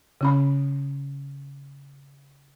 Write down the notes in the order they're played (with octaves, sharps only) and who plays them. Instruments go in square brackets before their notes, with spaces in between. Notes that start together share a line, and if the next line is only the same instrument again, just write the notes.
[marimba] C#3 C#4 B5